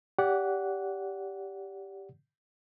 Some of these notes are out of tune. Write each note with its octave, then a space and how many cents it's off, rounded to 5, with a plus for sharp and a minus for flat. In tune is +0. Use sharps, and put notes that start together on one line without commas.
G4 +0 D5 -35 F#5 +0